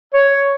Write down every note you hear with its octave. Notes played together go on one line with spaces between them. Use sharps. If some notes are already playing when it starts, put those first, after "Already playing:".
C#5